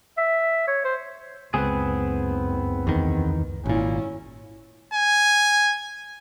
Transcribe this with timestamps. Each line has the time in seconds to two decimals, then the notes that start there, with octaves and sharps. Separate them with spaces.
0.18 E5
0.68 C#5
0.84 C5
1.54 F#1 C#2 B3 C4 G#4 B4
2.87 E2 D#3
3.66 G#1 A#2 C#4 E4
4.94 G#5